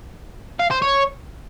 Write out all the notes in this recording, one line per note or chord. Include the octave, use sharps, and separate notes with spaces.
F5
C5
C#5